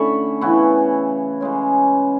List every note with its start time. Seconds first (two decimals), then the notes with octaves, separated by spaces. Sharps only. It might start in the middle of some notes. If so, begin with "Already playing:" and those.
Already playing: D3 A3 C#4 E4 A5 B5 C#6
0.41 C#3 E3 B3 E4 C#6
1.41 C#3 G#3 C#4